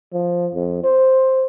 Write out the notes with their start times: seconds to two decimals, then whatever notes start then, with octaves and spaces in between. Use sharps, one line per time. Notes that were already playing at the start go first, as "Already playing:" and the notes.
0.13 F3
0.54 F2
0.84 C5